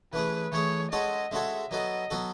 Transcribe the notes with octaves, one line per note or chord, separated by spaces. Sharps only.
E3 A3 C#4 G#4 B4
E3 A3 C#4 G#4 C#5
G#3 C#4 F#4 A4 C#5 D#5
G#3 C#4 F#4 A4 C#5 E5
F#3 B3 F#4 A4 D#5
F#3 B3 F#4 A4